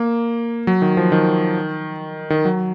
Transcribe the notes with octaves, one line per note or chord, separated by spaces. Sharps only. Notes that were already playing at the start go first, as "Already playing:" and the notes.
Already playing: A#3
F#3
D#3
F3
D#3
D#3
F#3